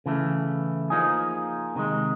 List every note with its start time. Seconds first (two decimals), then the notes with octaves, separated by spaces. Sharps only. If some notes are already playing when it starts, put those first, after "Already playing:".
0.06 C#3 E3 A3
0.90 F3 A#3 D#4 G#4
1.75 C3 D#3 G#3